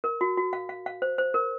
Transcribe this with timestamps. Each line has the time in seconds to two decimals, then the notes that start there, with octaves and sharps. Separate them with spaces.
0.04 A#4
0.21 F#4
0.37 F#4
0.53 F5
0.69 F5
0.86 F5
1.02 C5
1.18 C5
1.34 A#4